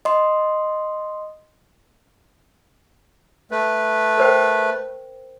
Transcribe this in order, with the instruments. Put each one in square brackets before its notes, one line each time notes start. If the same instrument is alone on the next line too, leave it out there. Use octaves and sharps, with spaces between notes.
[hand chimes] D#5 C6
[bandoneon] A3 B4
[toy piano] A#4 C5 G5